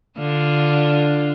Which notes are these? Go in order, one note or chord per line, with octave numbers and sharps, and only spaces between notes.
D3 D4 F4